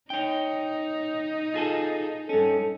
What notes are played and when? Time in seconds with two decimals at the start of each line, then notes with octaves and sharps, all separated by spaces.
0.10 D#4 C#5 G5
1.54 F4 G#4 A4
2.29 G2 C#4 A4